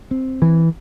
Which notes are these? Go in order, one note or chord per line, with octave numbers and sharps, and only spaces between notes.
C4
E3